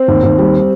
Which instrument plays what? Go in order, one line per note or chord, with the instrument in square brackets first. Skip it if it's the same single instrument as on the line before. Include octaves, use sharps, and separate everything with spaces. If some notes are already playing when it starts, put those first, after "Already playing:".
Already playing: [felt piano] C4
D#2
D#2
G3